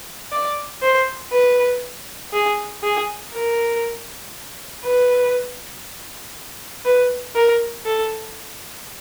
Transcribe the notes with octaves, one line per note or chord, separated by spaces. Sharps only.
D5
C5
B4
G#4
G#4
A#4
B4
B4
A#4
A4